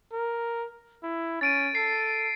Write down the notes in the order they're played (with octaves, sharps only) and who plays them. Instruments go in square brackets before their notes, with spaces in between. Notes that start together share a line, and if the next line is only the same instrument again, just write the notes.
[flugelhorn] A#4
E4
[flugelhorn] C#4 [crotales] A6 D7 D#7
[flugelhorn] A4 [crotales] C7